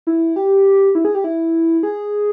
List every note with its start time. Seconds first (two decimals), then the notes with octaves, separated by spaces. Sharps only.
0.07 E4
0.36 G4
0.95 E4
1.05 G#4
1.15 G4
1.24 E4
1.83 G#4